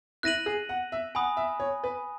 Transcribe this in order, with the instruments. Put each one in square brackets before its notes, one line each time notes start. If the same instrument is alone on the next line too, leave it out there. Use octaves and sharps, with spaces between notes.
[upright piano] E4 [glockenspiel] F#6 A#6 D#7 F#7
[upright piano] G#4
F#5
E5
[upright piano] F#5 [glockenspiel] G#5 B5 D#6
[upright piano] E5
C#5
B4